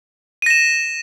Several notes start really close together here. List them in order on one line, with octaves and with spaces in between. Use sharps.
D#7 A#6 E7